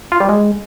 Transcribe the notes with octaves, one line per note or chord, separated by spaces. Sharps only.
F4
G3
G#3